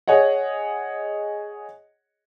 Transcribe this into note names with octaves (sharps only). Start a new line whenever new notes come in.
G#4 C#5 D#5 F#5